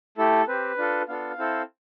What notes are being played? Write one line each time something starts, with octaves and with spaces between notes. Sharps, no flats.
A3 E4 G4 A4
C4 G4 B4
D4 F4 A4
B3 D4 F4 A4 F5
C4 E4 A4